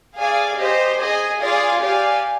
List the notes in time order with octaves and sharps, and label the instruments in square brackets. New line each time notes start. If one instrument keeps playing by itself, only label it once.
[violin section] G#4 D5 F5 G#5
G4 C5 D#5
G#4 D#5 G#5
F4 G#4 D5 F5 G#5
G4 D5 F5 G#5